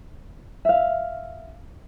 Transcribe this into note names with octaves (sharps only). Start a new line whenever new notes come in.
E5 F5